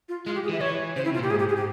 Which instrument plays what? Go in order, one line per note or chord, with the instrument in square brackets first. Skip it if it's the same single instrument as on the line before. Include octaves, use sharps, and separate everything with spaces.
[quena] F4
[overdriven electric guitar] G#3 [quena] F4
[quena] G4
G#4
[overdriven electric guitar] E3
[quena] E5
[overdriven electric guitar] E3 [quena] C#5
[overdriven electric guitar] C#3 [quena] C5
[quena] E4
[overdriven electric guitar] C3
[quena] F4
[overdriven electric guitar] A#2 [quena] G4
[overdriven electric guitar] G#2 [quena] G#4
[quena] G4
G#4
G4